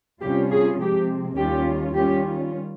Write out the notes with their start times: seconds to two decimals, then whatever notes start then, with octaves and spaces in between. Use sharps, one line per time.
0.21 C3 G3 C#4 F4 G4
0.51 G#4
0.79 C3 F3 G#3 C4 G4
1.36 D#2 D#3 G3 C#4 F4 G4
1.94 D#3 G3 C#4 F4 G4